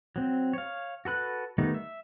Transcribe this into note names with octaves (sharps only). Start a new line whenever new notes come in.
F#3 C4
C#5 F5
F#4 A4 B4 F#6
D#3 G3 A3 B3 D#4
E5